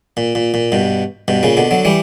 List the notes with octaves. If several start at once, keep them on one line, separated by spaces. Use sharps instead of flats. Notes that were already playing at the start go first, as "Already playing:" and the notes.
A#2
A#2
A#2
G2 B2
G2 B2
A#2 C#3
B2 D3
D3 F#3
E3 G3